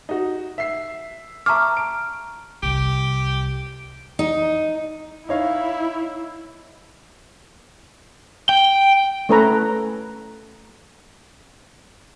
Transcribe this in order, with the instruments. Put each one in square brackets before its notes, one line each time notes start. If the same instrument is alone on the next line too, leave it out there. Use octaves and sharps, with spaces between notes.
[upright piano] D#4 F#4
E5 C7
[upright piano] E5 A5 D6 [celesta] A#5 C#6 F6
[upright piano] D7
[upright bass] C2 [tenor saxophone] G4
[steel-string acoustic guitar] D#4
[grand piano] D#4 C#5 F5 [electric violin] E4
[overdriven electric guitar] G5
[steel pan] A3 C#4 A4 B4 A#5